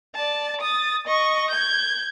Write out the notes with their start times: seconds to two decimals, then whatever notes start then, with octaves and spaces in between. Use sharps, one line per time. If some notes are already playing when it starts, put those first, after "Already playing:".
0.15 D5 A5
0.61 D#6 A6
1.07 D#5 C#6
1.50 G6 G#6